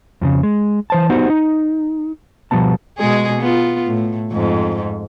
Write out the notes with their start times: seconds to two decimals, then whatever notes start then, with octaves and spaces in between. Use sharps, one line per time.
0.21 F2 A2 C#3
0.43 G#3
0.90 E3 C5 A5
1.09 B3 D#4 F#4 G4 C5
1.30 D#4
2.51 B2 F3 G3 B3 A5
2.98 B2 G#3 G#4
3.41 B3 F4
3.85 A2
4.31 F2 G#2